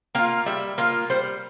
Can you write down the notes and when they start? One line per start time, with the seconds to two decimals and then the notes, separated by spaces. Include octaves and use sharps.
0.15 A#3 F4 F5
0.46 G3 E5
0.78 A#3 F4
1.10 G3 C5